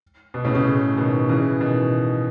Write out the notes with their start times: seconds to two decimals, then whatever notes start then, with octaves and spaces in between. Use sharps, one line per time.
0.34 B2
0.44 A2 C#3
0.55 A2 C#3
0.97 B2 D#3
1.29 C#3 E3
1.60 B2 D#3